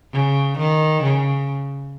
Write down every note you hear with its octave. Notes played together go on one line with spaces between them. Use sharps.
C#3
D#3
C#3